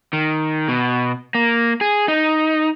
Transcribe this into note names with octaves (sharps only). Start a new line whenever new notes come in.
D#3
B2
A#3
G#4
D#4